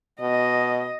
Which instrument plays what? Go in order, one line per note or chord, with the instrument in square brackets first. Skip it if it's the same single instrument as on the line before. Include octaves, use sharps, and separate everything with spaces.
[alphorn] B2 [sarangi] D#5